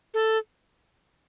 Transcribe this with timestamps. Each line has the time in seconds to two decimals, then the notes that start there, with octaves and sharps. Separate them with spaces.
0.14 A4